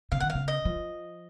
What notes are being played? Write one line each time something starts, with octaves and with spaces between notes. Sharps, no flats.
C#3 F5
D#3 F#5
F5
C#3
D#5
F3